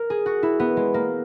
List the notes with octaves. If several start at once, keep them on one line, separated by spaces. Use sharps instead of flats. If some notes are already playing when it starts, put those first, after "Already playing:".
Already playing: A#4
G#4
F#4
E4
B3
G#3
A#3